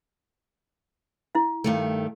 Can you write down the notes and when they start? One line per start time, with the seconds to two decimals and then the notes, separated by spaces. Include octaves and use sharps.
1.35 E4 F5
1.64 G2 D#3 A3